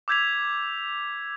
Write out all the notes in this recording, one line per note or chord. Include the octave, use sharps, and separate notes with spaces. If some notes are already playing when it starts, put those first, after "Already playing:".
D6 E6 G6 G#6 B6 F7